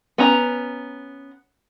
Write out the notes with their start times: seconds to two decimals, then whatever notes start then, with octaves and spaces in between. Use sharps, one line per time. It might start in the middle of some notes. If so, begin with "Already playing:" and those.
0.18 B3 C#4 A#5